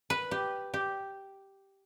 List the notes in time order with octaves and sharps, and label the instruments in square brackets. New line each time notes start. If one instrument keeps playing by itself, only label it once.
[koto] B4
G4
G4